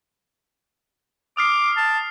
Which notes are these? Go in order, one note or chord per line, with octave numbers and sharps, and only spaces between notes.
D6 D#6 F6 C7
A5